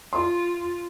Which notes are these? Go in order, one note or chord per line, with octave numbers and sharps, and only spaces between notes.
F4 C6